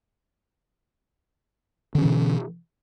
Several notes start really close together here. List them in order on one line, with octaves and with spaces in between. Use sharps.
D3 C#4 E3 B2